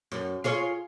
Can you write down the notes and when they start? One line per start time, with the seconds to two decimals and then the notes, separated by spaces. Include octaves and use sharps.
0.12 F#2
0.44 F4 G#4 C#5